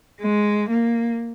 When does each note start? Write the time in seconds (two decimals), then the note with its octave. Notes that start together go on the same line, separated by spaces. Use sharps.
0.21 G#3
0.69 A#3